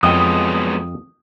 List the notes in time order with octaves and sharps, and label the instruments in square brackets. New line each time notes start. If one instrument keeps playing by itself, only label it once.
[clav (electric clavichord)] F2 D#5 G5 [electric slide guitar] F#3 G#3 B3 [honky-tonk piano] D#6